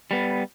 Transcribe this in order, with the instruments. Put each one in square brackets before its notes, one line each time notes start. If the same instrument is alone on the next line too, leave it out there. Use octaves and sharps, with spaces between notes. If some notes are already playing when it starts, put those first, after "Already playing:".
[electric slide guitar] G3 B3